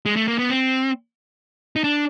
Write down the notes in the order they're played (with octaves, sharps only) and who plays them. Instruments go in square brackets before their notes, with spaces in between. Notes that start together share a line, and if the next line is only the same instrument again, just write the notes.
[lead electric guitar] G#3
A3
A#3
B3
C4
D#4
D4